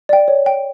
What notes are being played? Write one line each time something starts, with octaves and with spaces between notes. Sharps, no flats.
D5 G5
C#5
G5